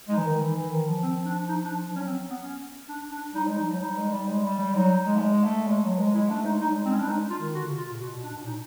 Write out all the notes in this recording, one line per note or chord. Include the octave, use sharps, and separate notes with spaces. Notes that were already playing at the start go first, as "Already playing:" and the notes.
G#3 D#4
E3
D#3
E3
E3
D#3
F3
C4
D4
D#4
D4
F3
F#3 C#4
C4
B3
C#4
D4
D4
G3 D#4
G#3
F3 D#4
F#3
G3 D#4
G#3
G3
G#3
G3
G3
F#3 D#4
G#3
A3
G#3
A3
G#3
F#3
G#3
G#3 E4
A3 D4
G#3 D#4
G3 D#4
G#3
G#3 C4
C#4
G3 D4
G#3 D#4
F4
D#3
D3 F#4
C#3
C3 F4
A#2
B2 F#4
B2
D4
B2
A#2 D#4